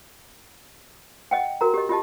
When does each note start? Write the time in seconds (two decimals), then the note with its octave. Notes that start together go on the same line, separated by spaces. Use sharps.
1.31 D#5 F#5 G5
1.61 F#4 A#4 A#5
1.74 G4 D#5
1.89 F4 G4 D#5 A5